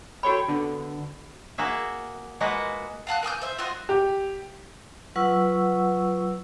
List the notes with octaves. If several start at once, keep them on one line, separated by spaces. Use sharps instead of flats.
F#4 A4 C#5 G5 B5
D3 B3
A#3 F#4 G#4 E5
G#3 A#3 F4 F#4 B4 F#5
F5 F#5 A5 F#6
A#4 G#5 D#6 G6
C5 E5
F4 F#4 D#5 C6
G4
F#3 F4 B4 F#5 C#6 E6